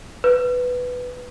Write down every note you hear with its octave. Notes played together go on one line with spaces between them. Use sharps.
B4